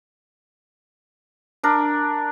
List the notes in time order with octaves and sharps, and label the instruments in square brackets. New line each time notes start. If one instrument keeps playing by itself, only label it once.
[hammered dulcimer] D4 A#4